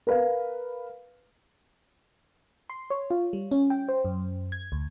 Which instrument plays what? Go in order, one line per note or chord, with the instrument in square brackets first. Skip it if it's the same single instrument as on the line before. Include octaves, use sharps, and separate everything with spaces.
[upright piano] A#4 B4 F5
[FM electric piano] C6
C#5
F4
G3
C#4
G5
C5
F#2
G#6
D2